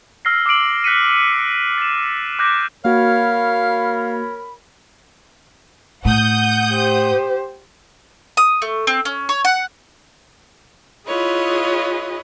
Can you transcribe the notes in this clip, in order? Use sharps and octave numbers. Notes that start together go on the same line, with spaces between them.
E6 F6 A#6 C7
D6 E6 C7 D7 F#7
F#6 B6 C#7 D#7
C#7
A6 B6 E7
D6 F#6 G6 A#6 E7
A#3 F#4 A#4 C#5 F5 B5
A2 F#5 D#6 G6
G4 C5
D#6
A3
C4
C#4
C#5
F#5
E4 F4 G#4 B4 C#5 D#5